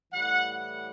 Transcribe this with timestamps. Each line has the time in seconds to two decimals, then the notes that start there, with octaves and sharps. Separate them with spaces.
0.12 A2 E3 G3 F#5
0.49 F#5